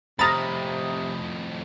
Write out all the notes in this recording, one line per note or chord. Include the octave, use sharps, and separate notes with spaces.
F2 A2 C3 A#5 B5 D#6 F6 A6